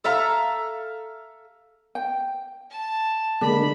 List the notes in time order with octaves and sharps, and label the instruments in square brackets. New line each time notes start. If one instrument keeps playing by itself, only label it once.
[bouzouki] A4 E5 F5 A#5
[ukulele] G5
[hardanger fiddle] A5
[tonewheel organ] D3 G#3 A#3 [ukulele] D4 [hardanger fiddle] B5